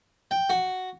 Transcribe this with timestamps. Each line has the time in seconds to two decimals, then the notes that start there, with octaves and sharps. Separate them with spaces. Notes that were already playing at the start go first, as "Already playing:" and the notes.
0.31 G5
0.50 F#4